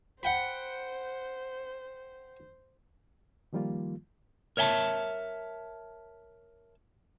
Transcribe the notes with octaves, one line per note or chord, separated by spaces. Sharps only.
C5 F#5 G5 B5
D#3 F3 G3 A#3 F4
A#4 C#5 E5 G5 A5